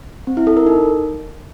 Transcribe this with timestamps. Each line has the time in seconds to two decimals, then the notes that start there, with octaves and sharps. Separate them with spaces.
0.27 C4
0.37 E4
0.47 A4
0.57 A#4
0.67 D#4